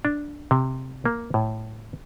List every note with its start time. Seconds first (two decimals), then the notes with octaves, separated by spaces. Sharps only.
0.05 D4
0.51 C3
1.05 A#3
1.34 A2